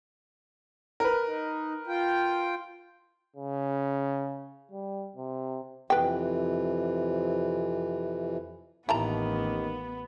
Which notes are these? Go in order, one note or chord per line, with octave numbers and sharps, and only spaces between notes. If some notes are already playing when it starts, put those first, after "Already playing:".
A#4 B4
D#4
F4 G5
C#3
G3
C3
F2 C3 E3 B4 G5
A1 D#2 B3 E4 A5 A#5